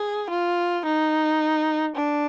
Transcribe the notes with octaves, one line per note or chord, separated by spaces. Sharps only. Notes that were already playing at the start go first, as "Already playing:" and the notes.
Already playing: G#4
F4
D#4
D4